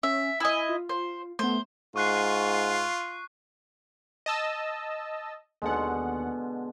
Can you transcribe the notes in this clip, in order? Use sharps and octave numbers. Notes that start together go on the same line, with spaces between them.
C#4 E5
E4 D#5 G#5 D#6 E6
F4
C5
A3 B3 C5
G#2 F4 C#6 F#6 C7
D#5 A5 E6
D#2 B2 D3 G#3 F#5